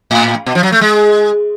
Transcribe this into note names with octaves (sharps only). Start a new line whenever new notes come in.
A2
B2
F3
F#3
A3
G#3